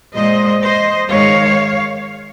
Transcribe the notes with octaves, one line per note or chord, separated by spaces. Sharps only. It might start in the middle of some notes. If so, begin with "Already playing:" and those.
A#2 G#3 C5 D#5
C5 D#5
G#2 D#3 G#3 C#5 F5